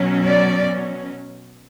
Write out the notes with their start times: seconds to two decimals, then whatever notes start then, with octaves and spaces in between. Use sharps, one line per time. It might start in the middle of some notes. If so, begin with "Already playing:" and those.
Already playing: B2 F#3 C#4
0.24 D5